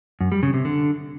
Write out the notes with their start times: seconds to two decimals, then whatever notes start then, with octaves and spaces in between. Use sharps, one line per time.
0.21 F#2
0.32 G3
0.43 C#3
0.54 C3
0.65 D3